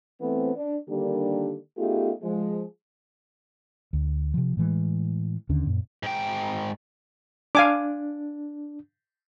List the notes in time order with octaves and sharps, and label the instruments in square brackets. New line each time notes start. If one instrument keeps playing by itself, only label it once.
[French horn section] E3 A3 B3 C4
D4
D3 D#3 G3 A#3 D4 G4
A3 B3 D#4 F4 G4 G#4
F3 G#3
[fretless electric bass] D2
C3 F3
A2 E3 G#3
D#2 D3 C#4
F#2 A#2
[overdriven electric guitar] G#2 G5
[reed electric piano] D4 [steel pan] F5 G#5 D6